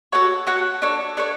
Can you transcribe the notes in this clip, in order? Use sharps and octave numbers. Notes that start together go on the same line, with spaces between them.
F#4 A4 C#5 F#5
F#4 A4 C#5 F#5
D4 A4 C#5
D4 A4 C#5